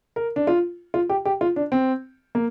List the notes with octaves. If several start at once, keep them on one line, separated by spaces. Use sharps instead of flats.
A#4
D4
F4
F4
G4
G4
F4
D4
C4
A#3